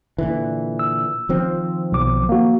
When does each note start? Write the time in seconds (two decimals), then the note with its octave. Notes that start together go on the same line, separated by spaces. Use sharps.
0.18 A#2 D3 E3
0.79 E6
1.29 D#3 F3 C4
1.92 B1 D6
2.29 A#3 F#4